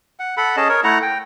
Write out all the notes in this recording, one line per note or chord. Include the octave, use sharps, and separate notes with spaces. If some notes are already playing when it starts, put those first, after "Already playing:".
F#5
A4 F#5 B5
C#4 G#4 D#5 A5
A#4 C#5
A3 E4 F#5 A#5
G5